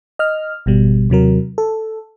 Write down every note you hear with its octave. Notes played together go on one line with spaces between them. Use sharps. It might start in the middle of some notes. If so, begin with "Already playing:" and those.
D#5 F6
G#1 B2 G3
D#2 C3 F#3 A#4
A4